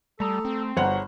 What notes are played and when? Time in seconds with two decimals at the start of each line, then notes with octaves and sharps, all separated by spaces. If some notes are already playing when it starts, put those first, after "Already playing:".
0.20 G3 A3 A4 A#5 D#6
0.45 C4
0.77 G1 F#4 G#4 C5 C#5 F#5 A#5